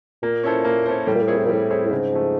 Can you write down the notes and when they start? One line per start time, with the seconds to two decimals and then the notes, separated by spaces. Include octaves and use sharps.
0.23 A#2 A#3
0.43 C#4 E4 A4 C5
0.65 A#3
0.86 C#4 E4 A4 C5
1.07 A2 G3
1.15 A#2
1.22 A2
1.28 A#2 C4 E4 G#4 C#5
1.37 A2
1.45 A#2
1.49 A2 G3
1.70 C4 E4 G#4 C#5
1.85 A2
1.91 G#2 C#3
2.12 F3 A3